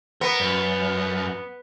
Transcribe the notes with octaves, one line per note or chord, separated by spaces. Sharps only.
B3 A#4
F#2